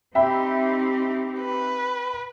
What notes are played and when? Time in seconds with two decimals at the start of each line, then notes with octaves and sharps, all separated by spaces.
0.15 C4 D#4 G4 E5 G5 B5
1.40 B4